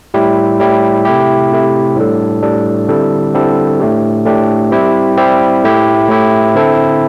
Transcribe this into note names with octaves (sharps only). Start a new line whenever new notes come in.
A2 G3 E4 G4
A2 G3 E4 G4
C3 A3 E4 G4
C3 A3 E4 G4
A2 G3 D4 A4
A2 G3 D4 A4
D3 G3 C4 E4 A4
D3 G3 C4 E4 A4
A2 A3 D4 G4
A2 A3 D4 G4
G3 C4 E4 G4
G3 C4 E4 G4
A2 A3 E4 G4
A2 A3 E4 G4
D3 C4 E4 A4